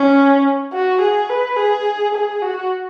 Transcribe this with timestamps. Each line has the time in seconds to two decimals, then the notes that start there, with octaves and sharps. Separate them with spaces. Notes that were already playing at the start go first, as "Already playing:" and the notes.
Already playing: C#4
0.73 F#4
1.01 G#4
1.29 B4
1.57 G#4
2.14 G#4
2.42 F#4